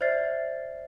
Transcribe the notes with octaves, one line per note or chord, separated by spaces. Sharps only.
C5 D5 E5 F6 A6 C7